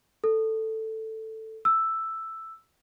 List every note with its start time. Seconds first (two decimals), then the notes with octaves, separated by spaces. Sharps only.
0.24 A4
1.65 E6